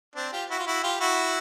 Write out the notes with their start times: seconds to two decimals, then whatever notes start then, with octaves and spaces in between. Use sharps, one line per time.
0.16 C4 D4
0.32 F4 G4
0.50 E4 F#4
0.59 F4
0.67 E4 F#4
0.83 F4 G4
1.00 E4 F#4